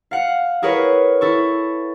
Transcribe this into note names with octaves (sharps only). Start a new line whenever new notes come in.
F5 F#5
E4 G#4 A#4 B4 C#5
E4 A4 C#6